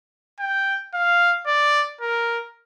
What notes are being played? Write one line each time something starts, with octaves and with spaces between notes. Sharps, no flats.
G5
F5
D5
A#4